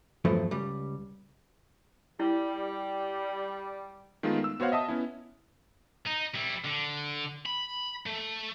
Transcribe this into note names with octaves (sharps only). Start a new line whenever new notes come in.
E2 G2 F3 F#3 A3
C#2 G3
G3 E4
D#3 G#3 A3 B3 D#4 F4
E6
B3 F#4 C5 C#5 F5 F#5
D#5 E5 A5 D#6
B3 C#4 E4
D#4
G3 E4
D3
B5
A3